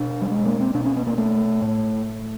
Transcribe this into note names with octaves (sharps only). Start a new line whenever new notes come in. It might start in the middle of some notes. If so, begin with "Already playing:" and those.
Already playing: B2 D4
G3
G#3
A#3
C4
B2 D4
C#4
B3
A#3
A3
A2